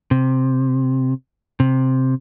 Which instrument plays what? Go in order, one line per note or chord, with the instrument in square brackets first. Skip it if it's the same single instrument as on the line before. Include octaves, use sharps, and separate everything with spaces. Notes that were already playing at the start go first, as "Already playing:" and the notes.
[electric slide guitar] C3
C3